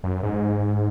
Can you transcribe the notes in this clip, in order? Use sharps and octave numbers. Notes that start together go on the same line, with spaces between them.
F#2
G#2